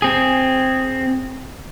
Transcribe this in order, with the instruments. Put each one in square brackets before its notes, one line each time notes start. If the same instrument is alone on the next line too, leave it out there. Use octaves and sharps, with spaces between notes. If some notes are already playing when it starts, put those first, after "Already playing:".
[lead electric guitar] C4 G#4